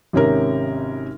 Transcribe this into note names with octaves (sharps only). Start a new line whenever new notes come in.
G#1 C3 C#4 A#4